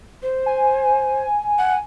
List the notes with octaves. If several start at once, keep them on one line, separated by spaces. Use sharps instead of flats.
C5
G#5
F#5